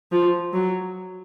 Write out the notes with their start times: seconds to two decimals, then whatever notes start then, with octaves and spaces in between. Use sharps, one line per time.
0.12 F3
0.53 F#3